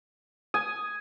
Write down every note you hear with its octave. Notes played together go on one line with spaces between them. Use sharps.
G#5 D#6